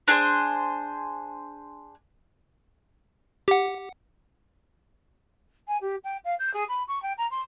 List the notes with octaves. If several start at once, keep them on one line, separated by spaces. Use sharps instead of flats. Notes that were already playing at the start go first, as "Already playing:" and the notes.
D4 G#4 A4 C5
G4 F#5
G#5
G4
G5
F5
G6
G#4
B5
C#6
G5
A#5
C6